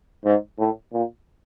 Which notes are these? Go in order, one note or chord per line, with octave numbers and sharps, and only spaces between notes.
G#2
A2
A#2